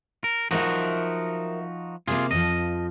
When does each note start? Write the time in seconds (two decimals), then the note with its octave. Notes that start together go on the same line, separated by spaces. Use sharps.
0.24 A#4
0.51 F3 F#3 D#4 F#4 A#4 E5
2.08 C3 A#3 F4 G#4
2.31 F2 F3 D#5